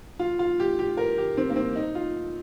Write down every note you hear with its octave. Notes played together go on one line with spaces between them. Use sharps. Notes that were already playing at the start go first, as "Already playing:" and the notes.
F4
F4
G4
G4
A#4
G4
C4
A#3
C4
D#4
F4